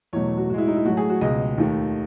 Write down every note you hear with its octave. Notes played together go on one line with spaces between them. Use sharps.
E2 B2 F#3 A3 C#5
F#4
A2 G#3 E4 F#4
D#4
E4
A2 F#3 A3 F#4
G#4
F#4
C#2 B2 G#3 D#5
D#2 D#3 A3